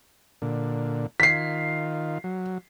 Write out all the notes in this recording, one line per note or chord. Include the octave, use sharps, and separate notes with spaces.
A#2 D3
D#3 F4 B6 C7
F#3